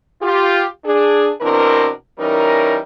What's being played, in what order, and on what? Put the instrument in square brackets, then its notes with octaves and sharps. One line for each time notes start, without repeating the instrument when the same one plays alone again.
[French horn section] F4 G4
D4 G#4
B2 E3 C4 D4 A#4
E3 G3 C#4 D#4 A#4